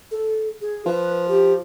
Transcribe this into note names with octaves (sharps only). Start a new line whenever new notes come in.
A4
G#4
F3 B4
G4